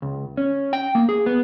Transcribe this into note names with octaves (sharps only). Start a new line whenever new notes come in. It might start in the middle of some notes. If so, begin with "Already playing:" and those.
C#2
C#4
G5
A#3
G#4
B3